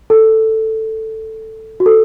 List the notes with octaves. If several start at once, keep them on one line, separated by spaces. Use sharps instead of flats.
A4
F#4
A4